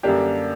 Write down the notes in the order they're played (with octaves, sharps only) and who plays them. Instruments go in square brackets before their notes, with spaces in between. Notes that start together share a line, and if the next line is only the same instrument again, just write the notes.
[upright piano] F#2 D3 G3 A#3 D4 G4